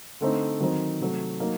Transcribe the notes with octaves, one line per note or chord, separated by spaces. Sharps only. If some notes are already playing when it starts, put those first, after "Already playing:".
D3 A3 C4 D#4
D#3 F#3 C4 D#4
C3 F#3 A3
F#3 A#3 D#4